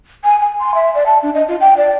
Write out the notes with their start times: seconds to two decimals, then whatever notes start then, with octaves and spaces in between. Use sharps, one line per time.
0.24 G#5
0.41 G#5
0.59 C6
0.75 E5
0.95 D5
1.06 A5
1.23 D4
1.35 D#5
1.48 F4
1.61 G5
1.77 D5